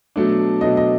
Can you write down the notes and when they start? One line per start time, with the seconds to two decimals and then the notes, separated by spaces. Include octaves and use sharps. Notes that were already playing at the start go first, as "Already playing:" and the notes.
0.16 B2 F#3 A3 D4
0.61 B2 F#3 A3 D4 D#5
0.77 D#5